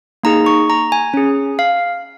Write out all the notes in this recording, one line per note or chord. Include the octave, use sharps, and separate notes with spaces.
A#3 D#4 G#4 A#5
C#6
A#5
G#5
C#4 G#4
F5